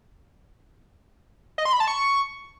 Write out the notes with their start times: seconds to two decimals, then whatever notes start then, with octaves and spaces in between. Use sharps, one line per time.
1.58 D#5
1.65 C6
1.73 B5
1.80 A5
1.88 C#6